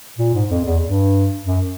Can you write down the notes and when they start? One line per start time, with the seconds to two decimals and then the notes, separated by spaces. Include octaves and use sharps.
0.18 A#2
0.33 G#2
0.50 F2
0.65 E2
0.82 G2
1.45 F#2